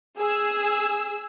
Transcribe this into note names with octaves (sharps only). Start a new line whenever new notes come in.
G#4 E6